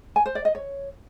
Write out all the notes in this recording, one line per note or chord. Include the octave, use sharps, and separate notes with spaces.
G#5
C5
D5
D#5
C#5